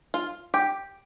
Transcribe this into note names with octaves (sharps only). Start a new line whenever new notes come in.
F4
G4